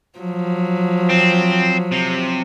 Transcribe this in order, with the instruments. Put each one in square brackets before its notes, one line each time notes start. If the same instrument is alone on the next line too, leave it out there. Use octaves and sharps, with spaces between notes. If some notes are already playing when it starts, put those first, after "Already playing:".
[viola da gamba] F3 F#3
[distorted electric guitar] C4
C3